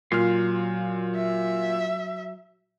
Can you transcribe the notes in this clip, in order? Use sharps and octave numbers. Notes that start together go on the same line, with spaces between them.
A#2 F#3 F4 C6 F6
E5